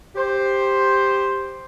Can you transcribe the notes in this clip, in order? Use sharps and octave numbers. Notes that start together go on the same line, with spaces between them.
G4 C5